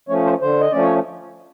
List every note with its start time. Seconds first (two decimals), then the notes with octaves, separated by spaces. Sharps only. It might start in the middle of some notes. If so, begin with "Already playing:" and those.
0.09 F3 A3 C#4 C#5
0.25 C5
0.41 D3 C5
0.60 D#5
0.71 F3 A3 C#4 D5
0.82 C#5